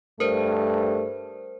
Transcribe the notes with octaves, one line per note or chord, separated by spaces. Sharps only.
G2 A3 A#4 C5